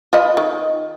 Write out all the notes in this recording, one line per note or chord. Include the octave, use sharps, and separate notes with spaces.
F4 B4 D#5
D#3